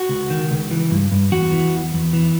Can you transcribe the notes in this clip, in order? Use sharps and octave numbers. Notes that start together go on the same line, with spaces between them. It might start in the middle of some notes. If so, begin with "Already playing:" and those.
Already playing: F#4
C#2
D#3
C#2
E3
G2
G2
E2 F#4
E3
E2
E2
E3